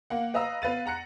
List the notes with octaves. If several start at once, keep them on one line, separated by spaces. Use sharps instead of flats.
A#3 F#5
B4 D#5 F5 A#5 E6
B3 B4 F5 A6 D#7
F#5 A#5 F#6 C#7